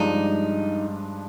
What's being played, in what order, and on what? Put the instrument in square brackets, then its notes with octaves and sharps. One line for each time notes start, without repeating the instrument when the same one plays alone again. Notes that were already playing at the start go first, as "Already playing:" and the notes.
Already playing: [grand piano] G2 F3 G#3 D4 [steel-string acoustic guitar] D#4